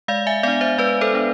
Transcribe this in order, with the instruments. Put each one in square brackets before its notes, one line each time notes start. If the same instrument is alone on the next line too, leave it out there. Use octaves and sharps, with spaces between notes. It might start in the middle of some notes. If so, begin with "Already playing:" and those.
[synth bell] G#3 D5 F5
E5 G#5
B3 D4 D5 F5
C5 E5
G#3 B4 D5
A4 C5
B3 D4